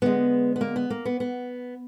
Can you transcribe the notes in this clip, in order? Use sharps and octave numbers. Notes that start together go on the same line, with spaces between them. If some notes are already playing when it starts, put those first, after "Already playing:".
D3 G#3 B3
B3
A#3
B3
A#3
B3
B3